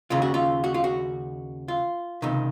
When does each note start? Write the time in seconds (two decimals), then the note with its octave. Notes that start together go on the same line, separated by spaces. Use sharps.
0.10 D#2 C#3 F4
0.22 F#4
0.34 F4
0.64 F#4
0.74 F4
0.84 F#4
1.68 F4
2.22 C#2 C3 D#3